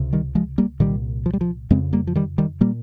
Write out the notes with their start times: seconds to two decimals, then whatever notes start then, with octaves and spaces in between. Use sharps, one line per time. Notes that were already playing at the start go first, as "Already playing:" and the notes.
Already playing: C#2 C3
0.13 D#3 G3
0.35 F3 G#3
0.58 G3 A#3
0.80 C2 A#2 D#3 G3
1.26 F3
1.33 G3
1.41 F3
1.70 F2 C#3 G#3 C4
1.93 G3 A#3
2.07 F3
2.15 D#3 G3
2.38 D#3 G3
2.61 A#2 G3 A#3